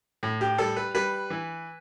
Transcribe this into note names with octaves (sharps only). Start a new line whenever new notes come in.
A2
G4
G3 A4
B4
G3 B4
E3